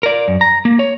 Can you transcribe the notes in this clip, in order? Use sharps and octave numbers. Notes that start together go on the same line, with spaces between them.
A#4 D5
F#2
A#5
A#3
C#5